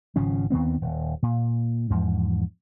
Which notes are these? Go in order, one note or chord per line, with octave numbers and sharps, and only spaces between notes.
G#1 C#3 F3 C#4
D#2 D#3 B3 C4
D#1
A#2
E2 G#2 F3